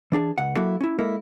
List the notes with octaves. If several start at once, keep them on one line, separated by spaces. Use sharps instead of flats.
E3 D4 G#4 A5
C#2 F#5
F#3 A#3 E4 F#4 A4
C#4 E4
G#3 A#3 E4 A4 A#4